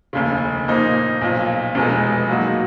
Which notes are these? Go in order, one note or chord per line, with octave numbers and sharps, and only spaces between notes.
F1 D#2 C#3
A#2 F3 A#3 D#4
B1 A#2 F3
F1 E2 B2 G#3
A#2 F#3 A#3 D#4 F#4